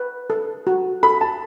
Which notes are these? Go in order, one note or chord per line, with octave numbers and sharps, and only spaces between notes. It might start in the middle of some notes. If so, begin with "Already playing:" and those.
Already playing: B4
A4
F#4
A4 B5
A5